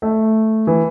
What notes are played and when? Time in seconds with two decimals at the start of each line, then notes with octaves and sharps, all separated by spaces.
0.02 A3
0.67 E3